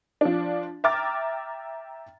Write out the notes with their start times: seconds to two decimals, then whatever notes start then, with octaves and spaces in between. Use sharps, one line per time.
0.21 F3 D4
0.84 E5 G5 A#5 D6 F6 A6